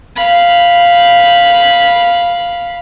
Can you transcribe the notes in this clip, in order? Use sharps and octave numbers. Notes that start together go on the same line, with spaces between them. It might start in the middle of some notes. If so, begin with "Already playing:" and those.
F5 B5